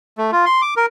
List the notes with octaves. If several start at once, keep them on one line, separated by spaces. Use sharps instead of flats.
A3
F4
C6
D6
A#4